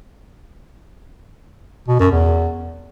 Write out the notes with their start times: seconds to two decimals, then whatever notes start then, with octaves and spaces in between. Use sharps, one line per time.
1.88 B2
1.99 F#2
2.11 E2